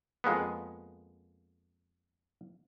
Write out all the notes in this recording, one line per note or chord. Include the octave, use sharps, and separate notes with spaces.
F2 G#3 A#3 B3